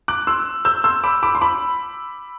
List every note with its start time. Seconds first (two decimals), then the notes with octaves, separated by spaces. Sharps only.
0.08 D6 F#6
0.27 C6 E6
0.65 E6 G6
0.84 C6 E6
1.04 B5 D6
1.23 B5 D6
1.35 C6
1.41 B5 D6